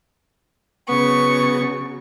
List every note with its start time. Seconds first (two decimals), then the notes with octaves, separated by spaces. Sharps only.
0.89 C#3 F#3 B3 C#6